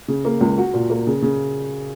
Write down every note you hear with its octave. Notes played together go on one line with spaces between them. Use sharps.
C#3
A#3
C#2
F#4
A#2
A#3
C#3
C#3